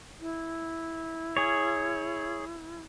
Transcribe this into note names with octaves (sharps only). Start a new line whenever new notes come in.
E4
G#4 C#5